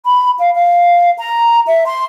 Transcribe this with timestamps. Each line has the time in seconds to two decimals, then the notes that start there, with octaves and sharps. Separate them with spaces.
0.04 B5
0.38 F5
0.54 F5
1.18 A#5
1.67 E5
1.85 C6